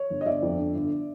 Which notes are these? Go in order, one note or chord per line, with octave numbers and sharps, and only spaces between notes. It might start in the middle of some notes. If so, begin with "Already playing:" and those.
Already playing: C#5
G1
D#5
G1 D5 E5
F2
D3
G1